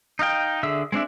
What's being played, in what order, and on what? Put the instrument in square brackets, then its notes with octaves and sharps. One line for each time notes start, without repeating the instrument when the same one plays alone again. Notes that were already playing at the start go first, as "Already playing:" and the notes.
[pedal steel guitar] D#4 D#5 F5 G5
D3 G#4 E5 E6
G#3 C4 D4 E5